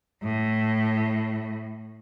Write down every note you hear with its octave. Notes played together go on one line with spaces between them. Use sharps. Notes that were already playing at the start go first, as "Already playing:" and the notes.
A2